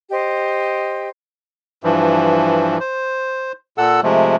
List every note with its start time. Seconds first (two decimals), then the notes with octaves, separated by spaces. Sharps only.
0.10 G4 C5 D#5
1.84 G2 E3 F3
2.80 C5
3.78 A#2 A4 F#5 E6
4.03 C3 F3 G#3 A3